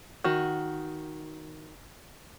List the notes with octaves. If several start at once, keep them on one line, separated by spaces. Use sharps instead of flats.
D#3 F#4